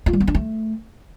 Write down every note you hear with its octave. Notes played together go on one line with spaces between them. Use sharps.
F4
G3
B3
D4
A3